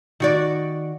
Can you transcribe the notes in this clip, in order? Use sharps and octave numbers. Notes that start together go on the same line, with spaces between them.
D#3 F#4 D5